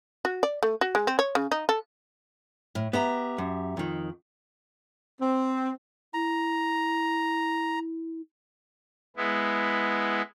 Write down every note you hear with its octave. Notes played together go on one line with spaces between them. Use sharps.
F#4
D5
A3
F#4
G#3
C4
C#5
C#3
D#4
A4
A2
B3 G4 E5 A#5
F#2
F2 D#3
C4
E4 A#5
G#3 B3 E4